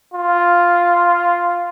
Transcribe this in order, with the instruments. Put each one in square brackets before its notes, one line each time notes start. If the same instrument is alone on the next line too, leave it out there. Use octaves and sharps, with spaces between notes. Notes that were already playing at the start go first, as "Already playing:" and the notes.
[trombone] F4